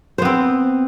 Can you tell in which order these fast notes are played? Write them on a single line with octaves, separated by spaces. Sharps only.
C5 B3 C4